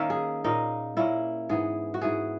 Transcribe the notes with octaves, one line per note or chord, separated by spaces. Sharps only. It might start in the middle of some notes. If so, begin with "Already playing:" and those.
Already playing: D#3 A#3 C#4 E5
G#4
A#2 A#3 C#4 D#4
A#2 A#3 C#4 E4
G#2 E3 B3 G#4
F#4
G#2 E3 B3 G#4